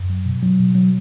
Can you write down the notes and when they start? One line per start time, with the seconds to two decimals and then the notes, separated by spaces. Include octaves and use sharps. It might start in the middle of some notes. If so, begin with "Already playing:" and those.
Already playing: F#2
0.10 F#3
0.26 B2
0.42 F#3
0.59 B2
0.75 F#3